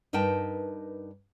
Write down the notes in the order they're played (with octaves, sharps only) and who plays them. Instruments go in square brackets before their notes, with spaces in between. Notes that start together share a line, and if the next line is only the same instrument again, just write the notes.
[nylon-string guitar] G2 D#4 A#4 B4 G5 A5